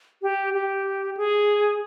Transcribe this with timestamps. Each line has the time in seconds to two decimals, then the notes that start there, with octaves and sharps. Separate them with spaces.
0.22 G4
0.54 G4
1.17 G#4